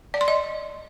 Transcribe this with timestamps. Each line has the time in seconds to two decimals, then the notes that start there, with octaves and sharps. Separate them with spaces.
0.14 D5
0.21 C6
0.28 D#5